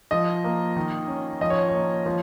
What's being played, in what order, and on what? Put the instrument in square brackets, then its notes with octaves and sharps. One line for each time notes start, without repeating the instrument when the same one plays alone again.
[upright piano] F3 D#5
A#3
D#3
C#4
F3 D#5
C#5
A#3 C#5
F3